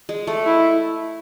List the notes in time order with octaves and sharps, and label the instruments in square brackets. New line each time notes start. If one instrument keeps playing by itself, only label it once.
[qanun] G#3
A3
[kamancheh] E4